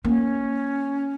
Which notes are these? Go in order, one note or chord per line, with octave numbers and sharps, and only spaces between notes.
A#3 C#4